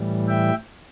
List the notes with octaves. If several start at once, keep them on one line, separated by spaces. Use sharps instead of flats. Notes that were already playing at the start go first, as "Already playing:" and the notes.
Already playing: A2 E3 G3
E5 G5